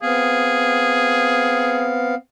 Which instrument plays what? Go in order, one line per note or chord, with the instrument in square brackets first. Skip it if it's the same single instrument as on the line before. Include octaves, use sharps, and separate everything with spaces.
[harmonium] B3 C4 F5 [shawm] G#4